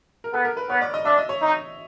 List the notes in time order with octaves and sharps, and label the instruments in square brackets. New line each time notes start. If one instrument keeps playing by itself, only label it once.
[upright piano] A#4
[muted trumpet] B3 [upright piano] A4
[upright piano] A#4
B4
[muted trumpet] B3 [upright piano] C#5
[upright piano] D5
D#5
[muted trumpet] D4 [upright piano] E5
[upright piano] D#5
C#5
[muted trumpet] D#4